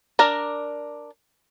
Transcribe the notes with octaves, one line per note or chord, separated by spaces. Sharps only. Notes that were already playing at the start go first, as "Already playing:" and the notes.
D4 A#4 A#5